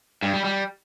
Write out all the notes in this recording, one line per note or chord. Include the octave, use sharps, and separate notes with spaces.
G2
G3
G3